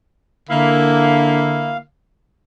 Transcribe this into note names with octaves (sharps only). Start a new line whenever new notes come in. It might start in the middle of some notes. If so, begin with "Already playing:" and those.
D3 A#3 E4 F5